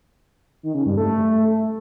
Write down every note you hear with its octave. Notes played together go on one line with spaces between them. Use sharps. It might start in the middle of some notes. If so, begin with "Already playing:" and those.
D#3
C#3
G2
A3